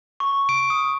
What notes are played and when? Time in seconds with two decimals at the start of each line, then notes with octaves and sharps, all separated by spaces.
0.20 C#6
0.49 D7
0.70 D#6